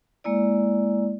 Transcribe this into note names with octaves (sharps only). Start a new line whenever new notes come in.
G#3 A#3 E4 D5